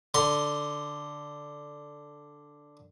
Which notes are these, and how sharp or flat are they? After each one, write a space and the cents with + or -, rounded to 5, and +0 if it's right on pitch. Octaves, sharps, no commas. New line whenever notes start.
D3 +0 C6 +0